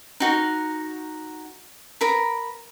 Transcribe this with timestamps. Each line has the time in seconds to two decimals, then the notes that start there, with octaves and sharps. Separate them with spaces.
0.20 D#4 F#4 A#4
2.01 A#4 B5